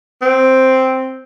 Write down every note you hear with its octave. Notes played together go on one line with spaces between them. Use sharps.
C4